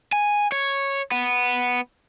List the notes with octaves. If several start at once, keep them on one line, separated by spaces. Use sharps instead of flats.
G#5
C#5
B3